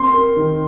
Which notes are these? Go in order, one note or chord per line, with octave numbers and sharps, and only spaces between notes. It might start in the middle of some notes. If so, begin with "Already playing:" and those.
Already playing: C4 C6
A#4
D#3